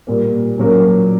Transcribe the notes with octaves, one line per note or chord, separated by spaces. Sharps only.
A#2 G3 A#3
A#2 F#3 A#3 C#4